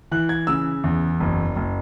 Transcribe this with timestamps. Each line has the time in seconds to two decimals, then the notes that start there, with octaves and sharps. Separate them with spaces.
0.11 E3 F#6
0.29 G#6
0.47 C#3 E6
0.84 E2
1.20 F#1
1.56 F#1